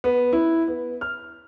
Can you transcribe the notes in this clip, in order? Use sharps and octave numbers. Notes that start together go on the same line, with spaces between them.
B3
E4
B3
F6